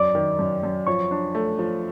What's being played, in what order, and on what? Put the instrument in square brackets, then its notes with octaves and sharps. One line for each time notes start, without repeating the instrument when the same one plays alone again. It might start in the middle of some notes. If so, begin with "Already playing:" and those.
Already playing: [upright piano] F#2 [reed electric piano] D5 D6
[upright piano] D#3
F#2
F#2
[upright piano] F3 [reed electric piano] C#5 C#6
[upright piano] D4
A3
F3